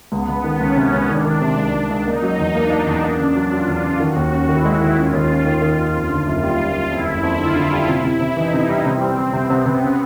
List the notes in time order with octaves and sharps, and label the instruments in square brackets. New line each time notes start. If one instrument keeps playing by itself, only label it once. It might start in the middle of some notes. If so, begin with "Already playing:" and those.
[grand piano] C#2 [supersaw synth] B3
[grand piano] C#2
D#3
[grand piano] C#2 [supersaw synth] C#4
[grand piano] C3
C#2
[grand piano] D#3 [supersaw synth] D4
[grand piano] D#3
C3
C#2
C#2
C#2
[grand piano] A#3 [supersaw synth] D#4
[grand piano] F#3
E2
[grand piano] A#3 [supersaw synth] D4
[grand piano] A#3
E2
[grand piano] A#3 [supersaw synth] D4
[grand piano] C#3
F#3
[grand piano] F#3 [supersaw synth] F4
[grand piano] E2
C#3
[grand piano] D#3 [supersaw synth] F#4
[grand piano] D#2
C#4
[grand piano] D#3 [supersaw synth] E4
[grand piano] G#3
D#3
[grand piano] C#4 [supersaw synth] F4
[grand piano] D#2
C#4
D#3
D#3
D#2
F2
D3
F#1
[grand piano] G3 [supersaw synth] F4
[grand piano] G3
G3
[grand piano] F2 [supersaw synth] E4
[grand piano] F#1
F2
[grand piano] D3 [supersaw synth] F4
[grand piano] D3
G3
[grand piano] C3 [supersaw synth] E4
[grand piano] C3
C3
[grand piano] E3 [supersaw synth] D#4
[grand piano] C3
G3
[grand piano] C3 [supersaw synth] C4
[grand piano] G3
G3
[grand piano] C3 [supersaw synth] B3
[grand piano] C3
C3
C#3